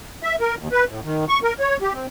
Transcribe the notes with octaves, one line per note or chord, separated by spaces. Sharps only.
E5
A#4
D#2
B4
A2
D#3
C#6
A#4
C#5
G4
C4